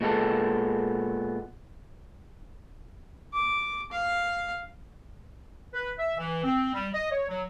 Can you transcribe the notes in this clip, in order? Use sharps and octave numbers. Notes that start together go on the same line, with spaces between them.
A#2 G#3 B3 A4
D6
F5
B4
E5
E3
C4
G3
D#5
C#5
F#3